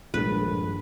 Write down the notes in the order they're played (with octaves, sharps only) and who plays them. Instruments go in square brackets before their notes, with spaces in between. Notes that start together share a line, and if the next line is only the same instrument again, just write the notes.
[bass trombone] A#1 [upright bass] G2 D#3 [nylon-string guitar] G#3 D4 A4 [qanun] B4